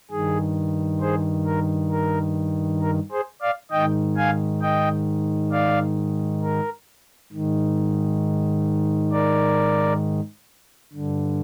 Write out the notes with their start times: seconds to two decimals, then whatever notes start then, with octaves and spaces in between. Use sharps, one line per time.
0.11 G2 D#3 G#4
1.01 G#4 C5
1.46 A#4
1.91 A#4
2.81 A#4
3.12 G#4 C5
3.42 D5 F5
3.71 G#2 D#3 D#5 G5
4.16 F5 G#5
4.62 D#5 G5
5.52 D5 F5
6.42 A#4
7.32 G#2 D#3
9.12 A#4 D5
10.93 G2 D3